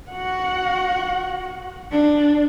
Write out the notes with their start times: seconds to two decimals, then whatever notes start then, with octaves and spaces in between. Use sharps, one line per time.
0.11 F#4 F#5
1.92 D4